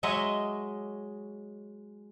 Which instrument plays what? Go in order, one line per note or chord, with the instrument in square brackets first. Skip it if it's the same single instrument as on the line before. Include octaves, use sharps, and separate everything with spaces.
[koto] F#3 G#3 C#5 D#5 E5